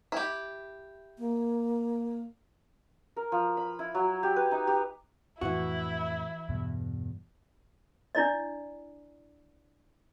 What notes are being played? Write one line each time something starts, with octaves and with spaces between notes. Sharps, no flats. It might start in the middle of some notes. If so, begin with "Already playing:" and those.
E4 G4
A#3
A#4
F3
B5
E4
F#3
G4
B4
D#4
G4
F2 A2 E3 E4 F#4
E2 G2 B2
D4 E4 D5 D#5